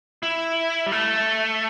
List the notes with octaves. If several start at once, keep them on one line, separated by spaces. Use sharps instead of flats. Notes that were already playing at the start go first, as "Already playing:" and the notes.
E4
G3
A3